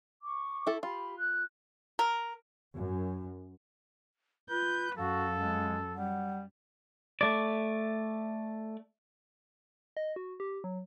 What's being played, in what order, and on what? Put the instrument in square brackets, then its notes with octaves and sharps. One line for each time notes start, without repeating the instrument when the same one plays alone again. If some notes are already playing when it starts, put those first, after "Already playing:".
[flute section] C#6 D6
[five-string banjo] E4 A4
[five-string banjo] F4 [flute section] G4 B5
[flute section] F#6
[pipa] A#4
[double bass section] F#2
[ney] F4 [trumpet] B4 [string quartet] G6
[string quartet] F#2 [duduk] F#4 [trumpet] A4 [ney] F5
[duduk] G#3
[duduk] G3 [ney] F#5
[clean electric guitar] A3 D5
[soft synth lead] D#5
F#4
G4
F#3